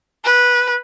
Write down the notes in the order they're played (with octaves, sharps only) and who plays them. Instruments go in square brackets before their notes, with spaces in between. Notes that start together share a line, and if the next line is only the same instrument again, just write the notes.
[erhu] B4